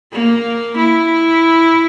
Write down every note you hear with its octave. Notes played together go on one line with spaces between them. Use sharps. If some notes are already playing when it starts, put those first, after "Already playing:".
A#3
E4